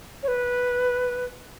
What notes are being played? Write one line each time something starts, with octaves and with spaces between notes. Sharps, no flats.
C#5
B4